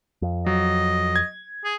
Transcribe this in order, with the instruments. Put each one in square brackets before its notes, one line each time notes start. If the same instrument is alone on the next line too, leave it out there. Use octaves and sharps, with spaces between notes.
[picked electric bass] F2
[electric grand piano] F#3 [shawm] D#5
[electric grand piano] G#6
[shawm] G#4